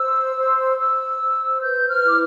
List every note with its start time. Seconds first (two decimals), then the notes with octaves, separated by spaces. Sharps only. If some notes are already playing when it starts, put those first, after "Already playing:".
Already playing: C5 E6
0.36 C5
0.78 C5 E6
1.20 C5
1.62 B4 G6
1.89 F6
2.04 E4 D6